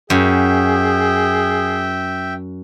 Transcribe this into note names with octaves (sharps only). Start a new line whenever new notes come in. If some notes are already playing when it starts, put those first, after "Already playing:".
F#2 G#4 E5 G5